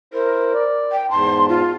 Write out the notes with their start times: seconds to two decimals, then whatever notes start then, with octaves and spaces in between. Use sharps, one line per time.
0.14 E4 A#4 C5
0.54 D5
0.92 G5
1.10 E2 G#2 A5 C6
1.49 F4